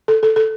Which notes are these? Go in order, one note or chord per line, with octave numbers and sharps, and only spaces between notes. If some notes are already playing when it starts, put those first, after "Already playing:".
A4
A4
A4